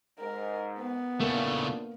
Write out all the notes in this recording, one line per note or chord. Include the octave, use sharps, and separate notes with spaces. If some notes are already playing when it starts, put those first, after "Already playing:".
G#2 A#4
B3
A2 C#3 A3 A#3 D4 F4